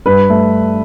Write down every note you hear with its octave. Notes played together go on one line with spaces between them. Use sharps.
G2 B4
A3